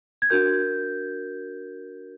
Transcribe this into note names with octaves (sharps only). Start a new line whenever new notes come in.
G#6
D4 F#4 A#4 G6